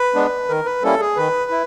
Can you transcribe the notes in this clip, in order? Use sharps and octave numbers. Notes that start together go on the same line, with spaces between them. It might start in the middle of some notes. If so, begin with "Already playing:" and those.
Already playing: B4
G#3 B3 D4
D#3 A#4
B4
G3 A#3 C#4 E4 A4
G#4
D#3 B4
E4